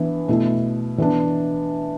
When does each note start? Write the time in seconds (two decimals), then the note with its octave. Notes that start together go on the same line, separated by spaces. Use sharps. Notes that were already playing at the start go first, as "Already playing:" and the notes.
Already playing: E3 B3 D4
0.28 B2 A3 E4
0.98 E3 B3 D4